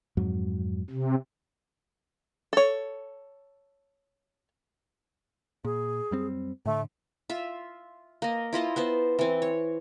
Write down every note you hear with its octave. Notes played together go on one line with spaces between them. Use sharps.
F2 G#2 F#3
C3
A4 C#5
A#2 G#4
F#2 G3 C4
A2 D3 A3
F4 E5
A#3 D#5
E4 F4 D#5 A5
B3 C5 A5
E3 C4
C#5